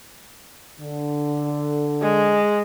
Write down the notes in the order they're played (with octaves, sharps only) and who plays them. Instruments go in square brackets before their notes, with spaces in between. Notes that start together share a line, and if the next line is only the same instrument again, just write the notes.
[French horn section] D3
[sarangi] G#3